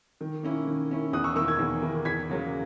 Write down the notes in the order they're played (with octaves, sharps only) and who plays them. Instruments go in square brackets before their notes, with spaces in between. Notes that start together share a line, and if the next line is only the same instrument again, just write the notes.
[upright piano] D#3
A#3 C#4 E4
D#3
A#3 C#4 E4
E2 D#6 F#6
C#6 E6
D#3 A#3 E4 C#6 E6
E6 G#6
E2
D#3 A#3 E4
E2 G#6 B6
C#3 F#3 A#3